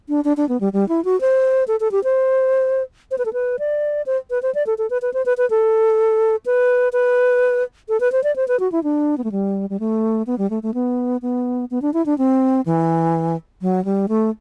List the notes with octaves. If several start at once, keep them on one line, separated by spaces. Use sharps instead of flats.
D4
D4
D4
B3
G3
G3
E4
F#4
C5
A4
A4
G4
C5
C5
B4
A4
B4
D5
C5
B4
C5
D5
A4
A4
B4
B4
C5
B4
B4
A4
B4
B4
A4
B4
C5
D5
C5
B4
F#4
E4
D4
B3
A3
G3
G3
A3
B3
G3
A3
A3
B3
B3
B3
D4
E4
D4
C4
E3
F#3
G3
A3